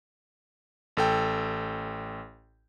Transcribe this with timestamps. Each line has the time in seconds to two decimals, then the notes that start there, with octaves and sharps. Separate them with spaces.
0.97 A1 A4 G5